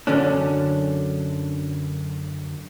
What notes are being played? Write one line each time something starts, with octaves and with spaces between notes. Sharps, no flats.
F#2 D3 C#4 D4